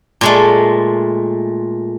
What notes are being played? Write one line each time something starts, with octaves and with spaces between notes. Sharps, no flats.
A#2 G#3 A3